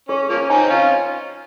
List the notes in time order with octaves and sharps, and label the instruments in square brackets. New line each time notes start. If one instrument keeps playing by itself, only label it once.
[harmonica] C#4 [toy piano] G#4
[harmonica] F3 A#3 C#4
[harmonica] C4 D#4 [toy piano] G#5
[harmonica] C#4 F4